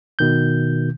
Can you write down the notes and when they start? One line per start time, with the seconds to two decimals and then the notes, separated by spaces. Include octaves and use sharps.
0.19 B2 D#3 G6